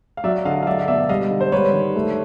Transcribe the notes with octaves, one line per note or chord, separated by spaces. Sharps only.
F5
F#3 D5 E5
D3 D#5 F5
F5
F#3 D5 E5
F5
B2 D5 E5
G3 D#5 F5
D3
C5
G3 B4 C#5
D#3
A3